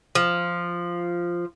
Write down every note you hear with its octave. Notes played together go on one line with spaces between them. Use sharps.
F3